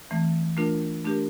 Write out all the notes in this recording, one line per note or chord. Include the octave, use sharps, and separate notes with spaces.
E3 A3 C4
A3 D4 F4 A#4
A3 D4 G4 A#4